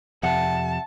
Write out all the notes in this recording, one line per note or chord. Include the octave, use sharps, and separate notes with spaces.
F2 C3 E5 F#5 A5